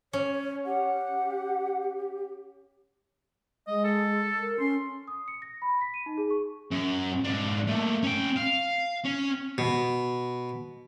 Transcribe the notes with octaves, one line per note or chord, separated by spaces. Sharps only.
C#4 C#5
G4 F#5
G#3 D#5
A4
A#4
C#4 C6
D#6
C#7
A#6
B5
B6
D#7
D#4
G#4
C#6
F#2
G#2 D4
A3 A#3
C#4 G5
F5
C#4
B2